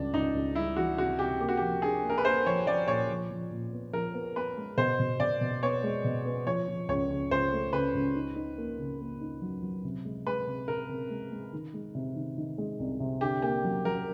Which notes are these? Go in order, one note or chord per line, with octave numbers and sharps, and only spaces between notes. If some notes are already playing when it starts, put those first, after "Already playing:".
Already playing: C#2 G3 D4
C#2 D#4
C#2
G3 E4
E3 F#4
C3 F#4
C3 G4
A#3 G4
F#4
F3 G4
D4 G#4
A#3
A#4
B4
A#3 C5
F3 C#5
F3 D5
A#2 C#5
F3
F3
A#2
B3
F3 A#4
B3
B3 B4
G#3
B2 C5
B2
B2 D5
B2
B3 C#5
G#3
B2
B3
F3 C#5
F3
C#2 C#5
C#3
C#2 C5
A3
C#3 B4
C#2
D#4
D#4
A#3
C#3
A#3
D#4
F#3
F#3
C3
G#3
G#3 B4
C3
C3 A#4
C3
G#3
G#3
D#3
G#3
C3
D#3
D#3
G#3
C2
C3
D3 G4
A#3 G4
F#3
F#3 A#4